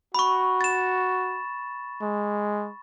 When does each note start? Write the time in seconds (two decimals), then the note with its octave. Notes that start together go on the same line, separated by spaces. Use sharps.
0.15 F#4 B5 C#6
0.61 A6 E7
2.01 G#3